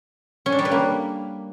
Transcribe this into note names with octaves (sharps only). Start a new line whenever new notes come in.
C#4
D4
G3
B4
A#3